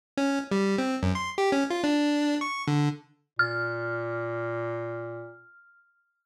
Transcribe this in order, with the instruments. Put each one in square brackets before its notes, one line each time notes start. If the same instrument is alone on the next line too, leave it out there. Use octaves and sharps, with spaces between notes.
[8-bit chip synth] C#4
G3
C4
F#2
C6
G4
C#4
F4
D4
C#6
D3
[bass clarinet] A#2 [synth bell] F6